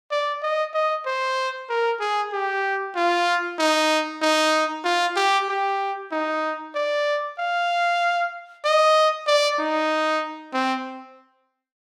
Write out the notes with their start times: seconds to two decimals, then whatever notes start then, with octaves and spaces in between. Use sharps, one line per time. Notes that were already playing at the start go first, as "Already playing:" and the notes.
0.11 D5
0.43 D#5
0.73 D#5
1.06 C5
1.69 A#4
2.00 G#4
2.32 G4
2.95 F4
3.59 D#4
4.21 D#4
4.84 F4
5.16 G4
5.49 G4
6.12 D#4
6.75 D5
7.38 F5
8.65 D#5
9.27 D5
9.59 D#4
10.53 C4